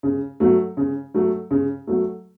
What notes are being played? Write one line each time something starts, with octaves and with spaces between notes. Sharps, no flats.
C#3
F#3 A3
C#3
F#3 A3
C#3
F#3 A3